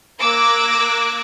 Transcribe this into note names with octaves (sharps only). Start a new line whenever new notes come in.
A#3 D6 E6 F#6 G#6 A#6